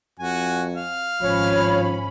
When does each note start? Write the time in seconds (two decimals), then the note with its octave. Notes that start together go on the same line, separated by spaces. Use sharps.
0.19 F2 F#4 G#5
0.76 F5
1.22 G#1 F3 C#4 C#5 B5